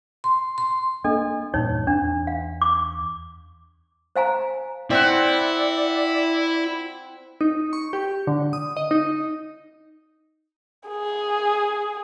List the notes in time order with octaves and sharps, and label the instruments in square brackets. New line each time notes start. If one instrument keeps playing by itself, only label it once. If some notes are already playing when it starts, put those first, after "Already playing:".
[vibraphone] C6
C6
[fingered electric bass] A#3 [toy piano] D4 A4 D#5
[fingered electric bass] E2 G2 A#2 [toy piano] D#4 C#5
[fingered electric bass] E2 [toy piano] D4
[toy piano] F5
D6
C5 F5 G#5 A#5
[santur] C4 F#5 [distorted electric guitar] E4 [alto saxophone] D5
[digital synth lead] D#4
C#6
G4
D3
D#6
D#5
D#4
[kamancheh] G#4